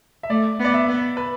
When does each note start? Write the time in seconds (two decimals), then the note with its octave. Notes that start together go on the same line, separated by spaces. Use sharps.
0.23 E5
0.30 A3 D5
0.59 B3
0.65 D5
0.74 E5
0.88 B3
1.17 B4